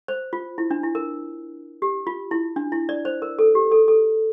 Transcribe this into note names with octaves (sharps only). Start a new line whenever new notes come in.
C5
F4
E4
D4
E4
A#4
G4
F4
E4
D4
E4
D5
C5
A#4
A4
G4
A4
A4